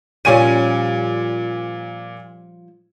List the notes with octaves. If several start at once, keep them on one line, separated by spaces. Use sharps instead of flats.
A#2 F3 G3 C#4 G#5 D#7